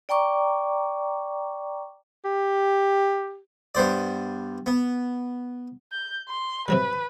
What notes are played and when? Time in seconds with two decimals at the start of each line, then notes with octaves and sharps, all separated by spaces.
0.09 D5 G5 A#5 C#6 D6
2.25 G4
3.75 G2 B3 C5 D5
4.66 B3
5.92 G6
6.29 C6
6.68 C3 F#3 G3 B4